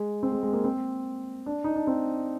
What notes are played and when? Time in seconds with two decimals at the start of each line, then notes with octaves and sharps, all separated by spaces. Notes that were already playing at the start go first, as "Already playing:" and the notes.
Already playing: G#3
0.23 C4
0.32 G#3
0.43 G#3
0.53 A#3
0.64 C4
1.46 D4
1.64 D#4
1.76 D4
1.87 C4